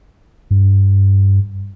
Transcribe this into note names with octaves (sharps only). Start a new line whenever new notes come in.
G2